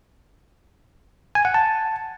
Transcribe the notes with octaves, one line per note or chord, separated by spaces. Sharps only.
G#5
F#5
A5